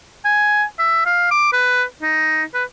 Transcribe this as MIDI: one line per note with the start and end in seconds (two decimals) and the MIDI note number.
0.25 0.64 80
0.79 1.06 76
1.06 1.28 77
1.31 1.50 86
1.53 1.83 71
2.02 2.44 63
2.54 2.64 71